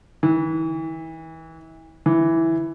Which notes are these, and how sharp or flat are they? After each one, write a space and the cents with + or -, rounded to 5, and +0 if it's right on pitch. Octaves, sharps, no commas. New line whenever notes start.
E3 -35
E3 -5